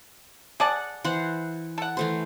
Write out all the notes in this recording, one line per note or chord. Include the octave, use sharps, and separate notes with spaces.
G#4 D5 F#5 A5
E3 C5 F#5
A4 F#5
E3 A3 C5